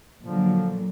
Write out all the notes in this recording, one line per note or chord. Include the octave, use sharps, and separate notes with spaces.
A#2 D3 F3 F#3